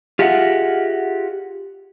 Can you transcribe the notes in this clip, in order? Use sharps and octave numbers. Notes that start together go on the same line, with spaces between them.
F4 G4 G#4 D#5 E5 F#5